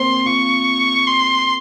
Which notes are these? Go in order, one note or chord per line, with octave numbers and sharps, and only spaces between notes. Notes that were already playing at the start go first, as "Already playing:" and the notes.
Already playing: A#3 C4 C6
F4 C#6
C6